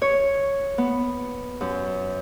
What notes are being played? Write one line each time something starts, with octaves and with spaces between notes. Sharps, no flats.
C#5
B3
F#2